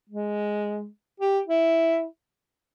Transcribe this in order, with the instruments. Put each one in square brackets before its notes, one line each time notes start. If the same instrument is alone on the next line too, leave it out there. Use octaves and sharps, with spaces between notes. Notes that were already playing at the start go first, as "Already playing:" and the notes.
[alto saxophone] G#3
G4
E4